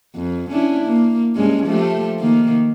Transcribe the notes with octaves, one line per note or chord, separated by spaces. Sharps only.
F2
C#4 D4 E4
A#3
G2 G#3 C#4
F3 A3 G4
D#3 A#3